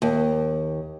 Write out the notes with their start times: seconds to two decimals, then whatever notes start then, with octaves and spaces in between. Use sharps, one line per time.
0.02 D#2